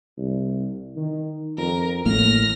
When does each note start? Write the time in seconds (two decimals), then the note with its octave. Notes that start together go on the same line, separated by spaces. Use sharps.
0.18 C2
0.96 D#3
1.58 F2 A#4
2.06 A1 A2 A#3 F6 A#6